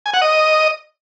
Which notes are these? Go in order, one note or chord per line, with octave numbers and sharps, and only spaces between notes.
G#5
F#5
D#5